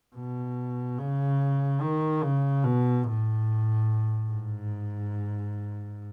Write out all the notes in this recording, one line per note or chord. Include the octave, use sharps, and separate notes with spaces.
B2
C#3
D#3
C#3
B2
A2
G#2